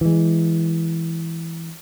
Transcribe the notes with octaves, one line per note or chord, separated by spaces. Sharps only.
E3 G#3